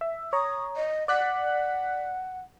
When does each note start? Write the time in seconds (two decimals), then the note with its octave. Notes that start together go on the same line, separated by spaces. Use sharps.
0.01 E5
0.33 C#5 A#5 D#6
0.76 D#5
1.08 D5 F#5 F#6 B6